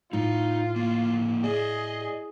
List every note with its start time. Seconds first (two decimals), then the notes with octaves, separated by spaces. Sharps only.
0.13 A2 D#4 F4
0.76 D3 A#3
1.44 G#4 D5 D#5